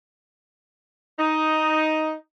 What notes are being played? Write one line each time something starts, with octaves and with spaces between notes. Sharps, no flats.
D#4